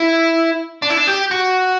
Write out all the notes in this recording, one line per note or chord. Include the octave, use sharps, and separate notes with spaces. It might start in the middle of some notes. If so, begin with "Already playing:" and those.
Already playing: E4
D4
E4
D4
G4
F#4